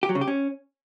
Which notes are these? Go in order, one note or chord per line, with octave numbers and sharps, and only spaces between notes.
G4
F#3
C#3
G4
C#4